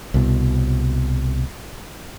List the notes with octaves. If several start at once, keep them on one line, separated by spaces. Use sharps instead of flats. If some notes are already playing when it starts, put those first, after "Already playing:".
C2 B2